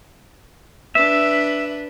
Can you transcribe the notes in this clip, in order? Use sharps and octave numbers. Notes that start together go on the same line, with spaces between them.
D4 B4 E5